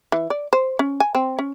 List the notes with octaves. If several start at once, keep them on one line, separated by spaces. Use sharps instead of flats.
E3
D5
C5
C#4
G#5
C4
C#4